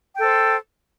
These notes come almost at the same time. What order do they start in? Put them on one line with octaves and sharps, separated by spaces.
G5 A4 C5